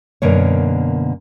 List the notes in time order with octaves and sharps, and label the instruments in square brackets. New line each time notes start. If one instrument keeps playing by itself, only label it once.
[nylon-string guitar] F#2 B2 D3 A#3 C#5